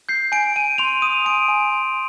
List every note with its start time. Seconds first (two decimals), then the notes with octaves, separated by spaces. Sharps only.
0.09 G6 C7
0.32 G#5 D7
0.56 G#5 D#7
0.78 C6 F7
1.02 D#6 D#7
1.25 G#5 D7
1.48 G#5
1.72 C6